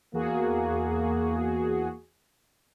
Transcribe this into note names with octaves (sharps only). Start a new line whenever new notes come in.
E2 A#3 F#4 G#4